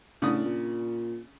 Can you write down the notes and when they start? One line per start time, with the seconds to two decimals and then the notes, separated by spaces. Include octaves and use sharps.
0.22 A2 C#3 D4 D#6
0.45 A#2